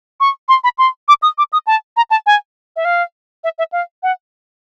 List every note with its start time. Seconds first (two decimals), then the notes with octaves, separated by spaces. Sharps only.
0.20 C#6
0.49 C6
0.64 B5
0.78 C6
1.08 D6
1.22 D#6
1.38 D6
1.53 D#6
1.67 A5
1.97 A#5
2.10 A5
2.26 G#5
2.76 E5
2.85 F5
3.44 E5
3.58 E5
3.72 F5
4.03 F#5